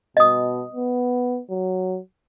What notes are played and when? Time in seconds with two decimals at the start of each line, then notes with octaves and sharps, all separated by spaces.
0.17 B2 D#5 D#6
0.73 B3
1.50 F#3